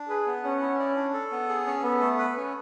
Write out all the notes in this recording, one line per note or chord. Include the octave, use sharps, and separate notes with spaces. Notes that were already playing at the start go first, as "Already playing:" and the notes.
Already playing: D4
G#4 B4
B3
C#4 F#5
E4
D5
D4
A4
B3
G#4
C#4
B3 A4
A3
B4
C#4